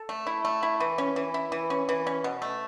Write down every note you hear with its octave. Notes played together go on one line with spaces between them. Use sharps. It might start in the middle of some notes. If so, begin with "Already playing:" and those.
Already playing: A4
A3
E4
A3
E4
E3
C#4
E3
E4
E3
C#4
E3
C#4
B2
A3